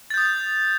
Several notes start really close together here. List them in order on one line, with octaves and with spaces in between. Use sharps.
A6 G6 D#6